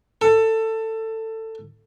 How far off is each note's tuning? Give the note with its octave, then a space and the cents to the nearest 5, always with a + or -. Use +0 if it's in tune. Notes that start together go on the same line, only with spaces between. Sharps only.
A4 +20